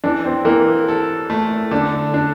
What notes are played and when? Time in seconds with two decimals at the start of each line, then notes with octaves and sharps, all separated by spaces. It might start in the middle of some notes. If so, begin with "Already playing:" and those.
0.04 E3 D4
0.25 C4
0.45 E3 A#3
0.88 A4
1.30 A3
1.71 D3 D4
2.14 D4